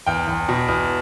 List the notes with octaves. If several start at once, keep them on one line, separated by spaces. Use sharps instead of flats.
E2 G5
E2
B2
E2